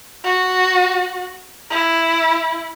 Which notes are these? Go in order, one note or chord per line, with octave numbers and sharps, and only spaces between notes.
F#4
E4